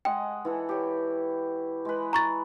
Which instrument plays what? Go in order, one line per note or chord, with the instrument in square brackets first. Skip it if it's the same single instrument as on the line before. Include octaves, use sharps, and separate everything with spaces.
[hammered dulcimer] G#3 D#5 F#5 [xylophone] G5
[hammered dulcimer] E3 E4 A4
G4 C#5
G#3 B4
[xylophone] A#5 C#6 A6